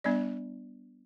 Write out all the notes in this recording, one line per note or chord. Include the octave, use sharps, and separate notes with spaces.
G3 B3 D4 D5